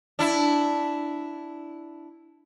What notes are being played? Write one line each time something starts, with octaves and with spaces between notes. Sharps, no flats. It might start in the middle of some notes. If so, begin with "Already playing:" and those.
D4 E4